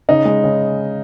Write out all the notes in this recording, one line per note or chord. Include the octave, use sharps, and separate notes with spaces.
C#3 D#4
G#3
C#3